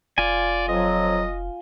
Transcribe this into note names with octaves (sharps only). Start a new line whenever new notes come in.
F1 F4 D5 G#5
F2 F3 F#3 D#5